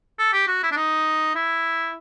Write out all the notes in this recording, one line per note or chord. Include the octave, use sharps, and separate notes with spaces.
A4
G4
F#4
E4
D4
D#4
E4